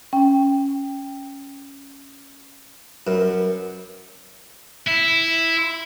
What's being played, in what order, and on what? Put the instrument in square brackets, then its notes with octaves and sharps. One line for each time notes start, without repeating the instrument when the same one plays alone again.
[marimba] C#4 G5
[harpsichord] F#2 [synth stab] A#4 B4
[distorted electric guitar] E4